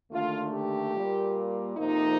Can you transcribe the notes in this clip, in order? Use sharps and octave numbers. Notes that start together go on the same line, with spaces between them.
D#2 D3 A3 F4
G4
A#2 G3 A#3
F2 C3 F3 A#3 D#4